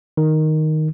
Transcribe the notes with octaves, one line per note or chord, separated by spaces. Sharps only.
D#3